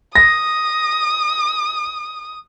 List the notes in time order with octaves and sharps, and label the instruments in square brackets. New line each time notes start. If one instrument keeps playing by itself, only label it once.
[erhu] D#6 [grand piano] A#6